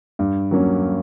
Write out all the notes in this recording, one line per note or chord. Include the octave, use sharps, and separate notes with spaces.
G2
F#3 A#3 C#4